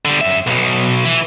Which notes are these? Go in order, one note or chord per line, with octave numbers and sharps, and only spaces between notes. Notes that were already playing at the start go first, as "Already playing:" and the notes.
D3 G3
F#2 E5
B1 B2
E3